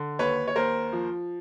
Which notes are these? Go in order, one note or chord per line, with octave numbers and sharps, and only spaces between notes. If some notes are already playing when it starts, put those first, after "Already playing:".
Already playing: D3
D#2 B4 C#5
C#5
D#2 A#4 C5
F3